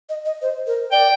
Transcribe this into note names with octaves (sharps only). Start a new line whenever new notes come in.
D#5
D#5
C5
A#4
D5 G5